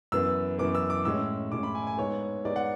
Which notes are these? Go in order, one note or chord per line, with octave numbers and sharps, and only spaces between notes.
F#2 E3 B3 E6
F#2 E3 B3 D6
E6
D6
A2 G#3 C#4 E6
A2 G#3 C#4 D6
B5
G#5
G#5
G#2 G#3 B3 C#5
G#2 G#3 B3 D5
F#5